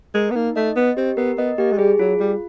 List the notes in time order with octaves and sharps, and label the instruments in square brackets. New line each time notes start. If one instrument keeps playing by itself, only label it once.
[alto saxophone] G#3 [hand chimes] A#4
[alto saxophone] B3
[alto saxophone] A#3 [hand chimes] D#4
[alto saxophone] A3 [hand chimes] D#5
[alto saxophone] B3 [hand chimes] D#5
[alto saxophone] C4 [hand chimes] G4
[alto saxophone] B3 [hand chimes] A#4
[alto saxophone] B3 [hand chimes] D#5
[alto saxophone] A#3 [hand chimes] G4
[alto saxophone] G#3
[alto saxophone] G3 [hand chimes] G#4
[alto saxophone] F#3 [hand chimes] F4
[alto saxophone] G3 [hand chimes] F4